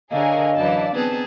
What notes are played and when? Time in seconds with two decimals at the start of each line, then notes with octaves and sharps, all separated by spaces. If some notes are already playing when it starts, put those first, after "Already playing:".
0.11 D3 G#4 A#4 C#5 D#5 F5
0.56 F#2 E3 B4 D5 A5
0.95 B3 C4 D#4 G#4 B4 A5